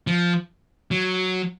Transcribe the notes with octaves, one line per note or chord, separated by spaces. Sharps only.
F3
F#3